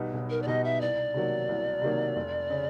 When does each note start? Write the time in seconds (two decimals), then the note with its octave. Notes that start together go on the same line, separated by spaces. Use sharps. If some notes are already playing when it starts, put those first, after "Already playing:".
Already playing: B1 B2 G3 B3 D#4
0.14 B1
0.30 A#4
0.42 D5
0.47 B2 G3 B3 D#4 D#5
0.64 E5
0.81 C2 D5
1.14 C3 D#3 F#3 A#3
1.49 C2
1.82 C3 D#3 F#3 A#3
2.16 F1
2.50 C#3